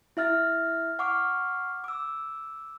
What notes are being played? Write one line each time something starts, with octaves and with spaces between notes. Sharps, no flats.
E4 E5 F6 A6
F#5 C#6 D6 F6
D6 E6